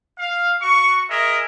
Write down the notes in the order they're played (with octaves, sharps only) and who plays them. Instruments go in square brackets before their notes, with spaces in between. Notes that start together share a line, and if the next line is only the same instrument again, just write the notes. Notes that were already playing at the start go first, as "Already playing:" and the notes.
[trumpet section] F5
F#4 C#6
G#4 A#4 D#5 E5